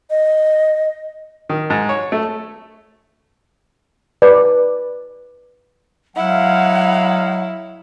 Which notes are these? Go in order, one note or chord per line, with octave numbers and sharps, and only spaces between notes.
D#5
D#3
G#2
C#5
A3
B4 D5
F#3 G#3 E4 F5 F#5